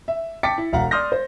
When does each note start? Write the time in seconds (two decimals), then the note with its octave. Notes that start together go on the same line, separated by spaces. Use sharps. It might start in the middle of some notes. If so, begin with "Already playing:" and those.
0.08 E5
0.43 G5 A5 D6 A6 B6 C#7
0.58 E4
0.73 E1 F5 F#5 A#5
0.91 D5 C6 D#6 F6 G6 A#6
1.12 C5